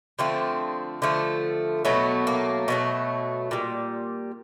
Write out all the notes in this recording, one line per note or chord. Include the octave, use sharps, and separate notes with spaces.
D3 F3 A3 C4
D3 F3 A3
B2 F#3 A3 B3
A#3
B2 F#3 A3
A#2 G3